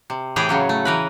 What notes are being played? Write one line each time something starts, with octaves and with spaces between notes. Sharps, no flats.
C3
A2 E3 G4 G#4 G5 G#5
C#3 F#3 C#4
A3
E3 A#4 B4